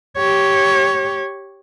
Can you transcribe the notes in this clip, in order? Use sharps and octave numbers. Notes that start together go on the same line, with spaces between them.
G4 C#5